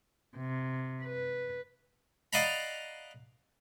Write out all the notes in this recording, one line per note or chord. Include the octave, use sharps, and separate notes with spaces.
C3
B4
D5 D#5 F5 F#5 A#5 B5